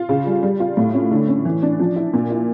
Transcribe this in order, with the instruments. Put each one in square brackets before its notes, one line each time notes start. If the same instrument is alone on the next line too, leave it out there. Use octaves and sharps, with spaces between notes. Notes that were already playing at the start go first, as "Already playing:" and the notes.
Already playing: [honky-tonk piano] F4
C#3
G3
G3
F4
A2
C#4
D3
C#4
E3
D4
F3
E4
A#2
E4